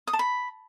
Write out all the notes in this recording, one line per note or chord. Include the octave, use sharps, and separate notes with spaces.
D#6
A5
B5